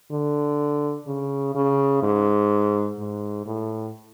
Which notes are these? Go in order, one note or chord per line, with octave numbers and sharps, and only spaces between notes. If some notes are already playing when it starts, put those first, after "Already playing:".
D3
C#3
C#3
G#2
G#2
A2